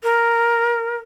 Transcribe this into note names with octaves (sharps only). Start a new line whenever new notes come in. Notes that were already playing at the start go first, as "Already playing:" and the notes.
A#4